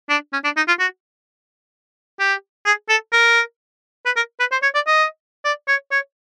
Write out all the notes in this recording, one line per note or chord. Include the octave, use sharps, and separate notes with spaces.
D4
C#4
D4
D#4
F4
F#4
G4
G#4
A4
A#4
B4
A#4
B4
C5
C#5
D5
D#5
D5
C#5
C#5